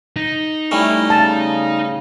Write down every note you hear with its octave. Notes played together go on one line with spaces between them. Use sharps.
D#4
G3 A3 C#4 E4
C#3 A5